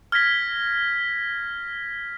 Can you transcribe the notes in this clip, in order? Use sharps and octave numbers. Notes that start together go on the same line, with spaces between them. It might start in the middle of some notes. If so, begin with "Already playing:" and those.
F6 G#6 A#6 B6 G7